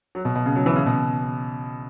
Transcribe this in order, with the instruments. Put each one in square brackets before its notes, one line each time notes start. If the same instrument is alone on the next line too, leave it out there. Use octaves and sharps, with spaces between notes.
[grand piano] F#3
B2
B2
C#3
F#3
E3
C#3
B2